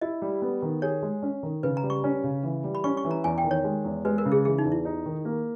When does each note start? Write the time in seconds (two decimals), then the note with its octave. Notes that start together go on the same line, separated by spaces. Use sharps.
0.01 E4 D#5
0.22 G3
0.42 B3
0.62 D#3
0.82 G#4 C#5
1.02 G#3
1.23 C#4
1.43 D#3
1.63 C#3 B4
1.77 A#5
1.83 G3
1.90 C#6
2.04 C#4
2.24 C#3
2.43 E3
2.64 G3
2.75 B5
2.84 C#4 C#6
2.97 C#6
3.04 E3
3.11 A#5
3.24 E2 G#5
3.38 G5
3.44 D#3
3.51 C#5
3.64 G#3
3.85 E2
4.05 G#3 B4
4.18 A#4
4.25 C#3
4.32 G#4
4.45 E3 G#4
4.58 D#4
4.65 E2
4.72 E4
4.85 D#4
5.06 D#3
5.25 A#3